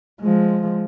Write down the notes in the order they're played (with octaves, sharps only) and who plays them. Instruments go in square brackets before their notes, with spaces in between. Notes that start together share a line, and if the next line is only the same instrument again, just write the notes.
[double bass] F3 G#3